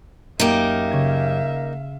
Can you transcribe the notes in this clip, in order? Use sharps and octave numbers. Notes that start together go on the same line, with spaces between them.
F#2 A#3 D#4 G4 E5 F5
C#3 G#6